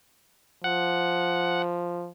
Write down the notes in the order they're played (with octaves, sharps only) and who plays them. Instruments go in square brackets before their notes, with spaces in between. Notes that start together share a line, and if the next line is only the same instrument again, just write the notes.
[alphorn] F3 [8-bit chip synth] F#5